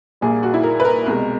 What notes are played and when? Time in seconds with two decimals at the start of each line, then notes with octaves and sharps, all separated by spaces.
0.21 A#1 A#2 G3 A#3 G#4
0.43 F#4
0.54 E4
0.63 A#4
0.80 B4
0.85 A#4
1.06 C2 B2 G#3